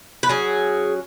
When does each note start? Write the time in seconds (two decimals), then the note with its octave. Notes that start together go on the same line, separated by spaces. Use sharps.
0.23 B4
0.29 F#3 C#4 G#4